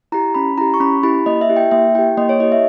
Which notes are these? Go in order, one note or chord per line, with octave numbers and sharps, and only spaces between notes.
E4 G4 A#5
C#4 B5
E4 G4 A#5
C#6
C#4 B5
E4 G4 B5
A#3 D#5
E5
E4 G4
G5
A#3 E5
E4 G4 G5
A#3 D#5
C#5
E4 G4 D#5
E5